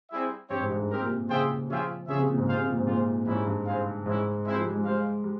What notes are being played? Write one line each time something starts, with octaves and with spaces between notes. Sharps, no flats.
G3 C4 E4 G#4 E5
G2 C4 G4 C#5
G#2
G#2
G2
C4 G4 A#4
A#2
C3
C#3 F4 G#4 C5 E5 G5
F3 C#4 F4 G#4 E5 G5
C#3 F4 G#4 C#5 E5
C3
A#2
G#2
F4 G#4 C5 F5
C3
A#2
G#2
A#2 F4 G#4 C5
G#2 G3 C#4 E4
G2
E4 G#4 C5 F5
G#2 G#3 C#4 E4
G#3 C4 E4 G#4 C5
F3
G3
G#3
G#3 F4 C5 F5
G3